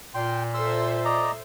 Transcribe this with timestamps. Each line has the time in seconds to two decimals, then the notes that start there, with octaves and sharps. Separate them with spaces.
0.14 A#2 G5 C6
0.54 A4 C5 E5 C6 E6
1.05 D5 D#5 A#5